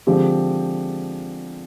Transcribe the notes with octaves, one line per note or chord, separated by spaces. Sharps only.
D3 F3 G#3 C4 G4